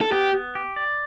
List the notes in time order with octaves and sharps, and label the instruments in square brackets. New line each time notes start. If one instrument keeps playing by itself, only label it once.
[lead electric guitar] A4
[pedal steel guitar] B3 [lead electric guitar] G4
[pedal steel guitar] B3
G4
D5